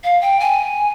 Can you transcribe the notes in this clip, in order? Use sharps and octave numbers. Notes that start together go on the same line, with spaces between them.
F5
G5
G#5